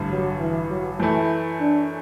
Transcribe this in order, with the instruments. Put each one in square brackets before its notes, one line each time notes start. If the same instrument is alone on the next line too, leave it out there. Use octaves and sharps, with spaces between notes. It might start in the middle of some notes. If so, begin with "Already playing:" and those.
Already playing: [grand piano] A1 G2 D3
[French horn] F#3
E3
F#3
[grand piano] F#2 E3 A3 [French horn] E4
[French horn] D4